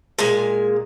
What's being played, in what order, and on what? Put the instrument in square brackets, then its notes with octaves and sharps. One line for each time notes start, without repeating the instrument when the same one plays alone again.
[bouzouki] A#2 G#3 G#5